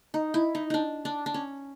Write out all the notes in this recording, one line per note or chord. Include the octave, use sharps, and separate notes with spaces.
D#4
E4
D#4
D4 D#4
D4
D4
C#4